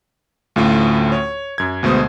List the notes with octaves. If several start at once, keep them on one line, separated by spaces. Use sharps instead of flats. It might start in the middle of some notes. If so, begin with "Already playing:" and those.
D2 A2 C#4 F4
C#5
F#2 G#6
D2 B2 G#3 C5 D#6